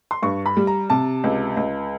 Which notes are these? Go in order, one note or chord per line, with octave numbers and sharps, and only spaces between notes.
C6
G2 C#6
B5
G3
A#5
C3 A5
C#2
C#2